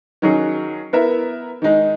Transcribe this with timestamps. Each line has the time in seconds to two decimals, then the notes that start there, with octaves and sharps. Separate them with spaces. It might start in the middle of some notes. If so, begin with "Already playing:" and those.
0.22 D#3 F#3 C#4 G#4
0.93 B3 E4 A#4 E5
1.62 D#3 G#3 D#4